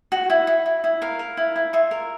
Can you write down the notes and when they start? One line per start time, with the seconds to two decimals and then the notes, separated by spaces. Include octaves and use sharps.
0.12 F#4
0.30 E4
0.47 E4
0.66 E4
0.84 E4
1.02 A#4 F5
1.19 A#4
1.37 E4
1.56 E4
1.73 F4 E5
1.91 A#4